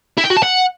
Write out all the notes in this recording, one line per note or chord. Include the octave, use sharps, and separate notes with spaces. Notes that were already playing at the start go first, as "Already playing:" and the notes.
E4
G5
F#4
A5
F#5